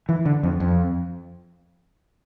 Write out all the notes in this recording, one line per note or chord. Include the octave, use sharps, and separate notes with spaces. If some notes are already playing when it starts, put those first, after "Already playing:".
E3
D3
F2
F2